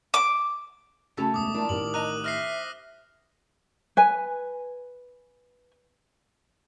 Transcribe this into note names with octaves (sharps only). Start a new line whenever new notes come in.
D6
C#3 A3 C#4 F#4 A4 B5
E1 C#2 D6 D#6
E3 D4 F4 A#4 D5
A1 A2 D#3 A#4 F#7
D#5 A#5 F#6 D#7
C5 E5 F6 A#6 C7
B4 G#5